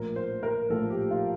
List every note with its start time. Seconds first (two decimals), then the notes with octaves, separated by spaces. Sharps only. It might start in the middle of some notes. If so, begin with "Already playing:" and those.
Already playing: A#1 A2 F3 A#4
0.16 C5
0.43 A#4
0.70 A#1 A2 F3 A4
0.90 G4
1.11 F4